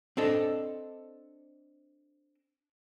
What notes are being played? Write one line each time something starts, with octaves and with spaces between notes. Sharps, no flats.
C4 D4 A4 D#5